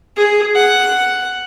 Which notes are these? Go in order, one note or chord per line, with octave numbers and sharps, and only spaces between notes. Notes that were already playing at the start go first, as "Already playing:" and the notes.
G#4
F#5